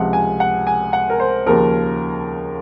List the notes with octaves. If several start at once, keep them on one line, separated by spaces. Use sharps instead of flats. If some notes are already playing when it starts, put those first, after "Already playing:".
Already playing: C#2 C3 F3 F#5
G#5
F#5
G#5
F#5
A#4
C5
D#2 C#3 F3 A#4